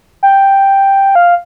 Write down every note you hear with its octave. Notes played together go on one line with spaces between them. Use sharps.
G5
F5